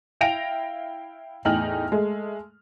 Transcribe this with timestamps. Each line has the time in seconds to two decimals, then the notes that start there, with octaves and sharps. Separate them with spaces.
0.21 E4 F5 G5 A#6 D7 F7
1.45 E2 A2 D#4 G5 F6 F#7
1.92 G#3 A3